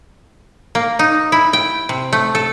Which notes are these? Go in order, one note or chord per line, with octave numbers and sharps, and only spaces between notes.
A#3
D#4
E4
G5
C3
A3
A4